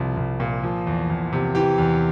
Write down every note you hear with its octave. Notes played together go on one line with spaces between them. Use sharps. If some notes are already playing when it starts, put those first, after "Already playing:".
Already playing: C2 F3 F4
C2
A#2
F3
E2
E2
C3
E3 G4
E2